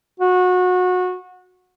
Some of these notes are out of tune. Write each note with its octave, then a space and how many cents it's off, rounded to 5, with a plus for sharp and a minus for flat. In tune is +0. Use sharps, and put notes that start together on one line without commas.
F#4 -25